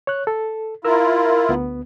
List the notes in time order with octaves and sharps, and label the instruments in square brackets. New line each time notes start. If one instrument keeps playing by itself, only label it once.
[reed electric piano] C#5 F#6
A4
[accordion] E4 F4 [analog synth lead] A#4 [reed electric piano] E6
[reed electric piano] D2 B3